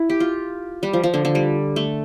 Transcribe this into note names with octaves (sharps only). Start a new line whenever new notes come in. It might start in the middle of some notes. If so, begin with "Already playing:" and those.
Already playing: E4
G4
F4
G3
F3
F3
D3
D3
G3
A3